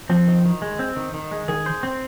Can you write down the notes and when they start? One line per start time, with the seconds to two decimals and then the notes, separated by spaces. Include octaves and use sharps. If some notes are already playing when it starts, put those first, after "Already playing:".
0.09 F3 C4
0.27 D#3
0.45 D#3
0.62 G#3
0.79 C4
0.96 D#3
1.14 D#3
1.31 G#3
1.48 D#3 G#4
1.66 C5
1.83 C4